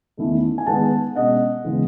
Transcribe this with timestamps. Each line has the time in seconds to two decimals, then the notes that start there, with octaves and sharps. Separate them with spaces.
0.17 E2 D#3 A3 C#4 E4
0.58 G#5
0.66 D#3 G#3 B3 F#5 A5
1.16 B2 G#3 C#4 D#5 F#5
1.65 C#3 E3 G#3 B3